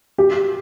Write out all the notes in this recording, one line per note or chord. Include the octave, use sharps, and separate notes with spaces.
G4